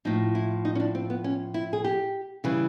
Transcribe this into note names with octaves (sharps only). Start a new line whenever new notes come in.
A2 F3 D#4
E4
D#4
C#4
D4
C4
B3
C#4
E4
G#4
G4
C#3 E3 G3